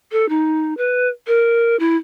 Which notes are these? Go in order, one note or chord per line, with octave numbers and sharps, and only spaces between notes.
A4
D#4
B4
A#4
E4